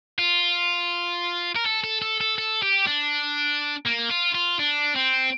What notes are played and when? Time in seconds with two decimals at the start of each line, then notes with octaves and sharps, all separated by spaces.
0.19 F4
1.56 A#4
1.66 A4
1.84 A4
2.02 A4
2.21 A4
2.38 A4
2.63 G4
2.87 D4
3.85 A#3
4.10 F4
4.35 F4
4.59 D4
4.96 C4